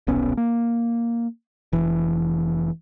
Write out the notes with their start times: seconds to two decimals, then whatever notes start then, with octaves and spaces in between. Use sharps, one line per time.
0.07 D#1 B1 B3 C#4
0.37 A#3
1.73 F1 E3